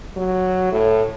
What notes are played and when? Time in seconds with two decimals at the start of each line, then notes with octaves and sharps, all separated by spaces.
0.16 F#3
0.72 A2